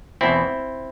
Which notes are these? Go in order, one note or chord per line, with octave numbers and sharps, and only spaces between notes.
E2 B2 C4 E4